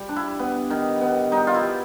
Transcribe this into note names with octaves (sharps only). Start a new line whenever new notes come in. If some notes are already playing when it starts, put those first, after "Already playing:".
Already playing: G3
D4
E4
B3
D#3
B3
G3 D#4
F4
E4
G3